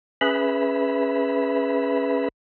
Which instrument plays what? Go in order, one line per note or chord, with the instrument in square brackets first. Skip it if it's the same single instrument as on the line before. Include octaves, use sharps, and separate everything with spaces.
[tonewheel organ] C#4 G#4 B4 E5 B5